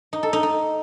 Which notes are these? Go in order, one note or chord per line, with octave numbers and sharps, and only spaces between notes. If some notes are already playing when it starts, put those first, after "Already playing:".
D#4
A4
D#4
D#4